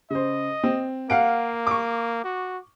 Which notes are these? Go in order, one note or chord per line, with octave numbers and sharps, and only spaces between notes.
C#3 C5 D#5
C4
A#3 F5 F#5 D7
C#6 D6
F#4